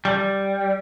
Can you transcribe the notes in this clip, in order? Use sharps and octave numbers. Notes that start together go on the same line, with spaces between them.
G3